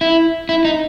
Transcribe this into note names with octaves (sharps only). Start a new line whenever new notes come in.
E4
E4
D#4